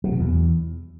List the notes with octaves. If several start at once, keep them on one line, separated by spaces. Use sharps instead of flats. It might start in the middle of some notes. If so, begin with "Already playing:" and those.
F#3
B2
E2